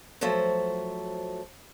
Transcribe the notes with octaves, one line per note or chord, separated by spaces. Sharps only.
F3 F#3 A3 A4 C5